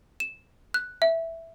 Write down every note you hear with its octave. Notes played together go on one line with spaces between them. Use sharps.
E7
F#6
E5